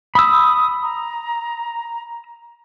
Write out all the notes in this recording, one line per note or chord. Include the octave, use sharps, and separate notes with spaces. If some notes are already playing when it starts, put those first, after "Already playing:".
B5 D#6 E6
A#5